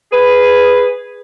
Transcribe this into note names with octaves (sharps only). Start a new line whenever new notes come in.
G#4 B4